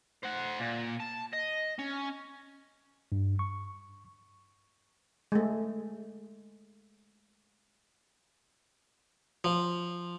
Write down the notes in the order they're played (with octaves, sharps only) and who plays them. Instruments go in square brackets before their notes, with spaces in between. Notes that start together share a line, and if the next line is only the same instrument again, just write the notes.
[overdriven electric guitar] C5 F#5
A#2
A5
D#5
C#4
[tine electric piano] G2
C#6
[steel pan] G#3 A3
[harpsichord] F3